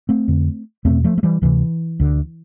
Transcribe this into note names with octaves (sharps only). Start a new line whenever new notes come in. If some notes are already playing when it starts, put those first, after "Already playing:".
A3 C4
F2 D3
E2 B2 A3 C4
F3 A3
A3
E3 G3
D2 C3 E3
D2 D3